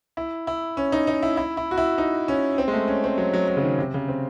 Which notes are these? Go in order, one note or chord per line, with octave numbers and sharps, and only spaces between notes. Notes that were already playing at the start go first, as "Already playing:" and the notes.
E4
E4
C#4
D#4
D#4
E4
E4
E4
F#4
E4
D#4
C#4
C4
G#3
A3
C#4
C4
F#3
F#3
F#3
C#3
D#3
C3
C#3
C4